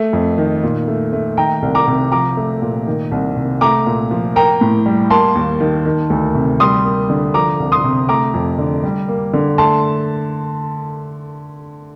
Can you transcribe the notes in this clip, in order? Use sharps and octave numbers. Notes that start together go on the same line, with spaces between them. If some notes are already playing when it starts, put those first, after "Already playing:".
Already playing: A3
F2
D#3
A#2
A3
A3
D#3 G5 A#5
C2
A#5 D6
C3
F3 A#5 D6
A3
A#2
D#3
C2
C3
A3 A#5 D6
A#2
F3
A#3 G5 A#5
A2
G3
A#3 A5 C6
D#2
D#3
D#3
D2
C3
G3 C6 D#6
A#3
D3
F3 A#5 D6
C2
C6 D#6
C3
A3 A#5 D6
F2
D3
G3
A#3
D3
A3 A5 C6